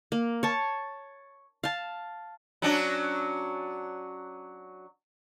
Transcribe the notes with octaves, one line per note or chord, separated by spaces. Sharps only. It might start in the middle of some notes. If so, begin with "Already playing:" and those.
A#3
C#5 A5
F5 A5
F#3 C#4 D4